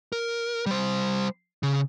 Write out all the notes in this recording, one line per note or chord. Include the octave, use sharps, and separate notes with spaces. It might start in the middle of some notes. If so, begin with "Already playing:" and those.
A#4
G3 C5
C#3